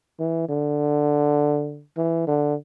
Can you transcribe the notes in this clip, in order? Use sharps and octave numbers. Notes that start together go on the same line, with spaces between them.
E3
D3
E3
D3